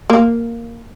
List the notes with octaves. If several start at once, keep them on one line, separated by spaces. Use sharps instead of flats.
A#3